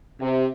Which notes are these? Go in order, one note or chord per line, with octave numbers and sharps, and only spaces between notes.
C3